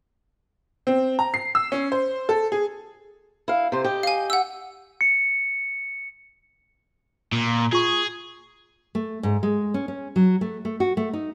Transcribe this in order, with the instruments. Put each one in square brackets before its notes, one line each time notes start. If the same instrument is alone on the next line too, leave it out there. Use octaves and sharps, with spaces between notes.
[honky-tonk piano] C4
A#5
C7
E6
C#4
C5
A4
G#4
[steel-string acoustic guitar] E4 F5
C3 C5
G4 D#5
[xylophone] F5 G#5
F#5 E6
[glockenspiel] C#7
[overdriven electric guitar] A#2
[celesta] F4 C#6 [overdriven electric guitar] G#4
[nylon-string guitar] A3
G#2
G#3
C#4
C#4
F#3
A3
A3
F#4
A3
D#4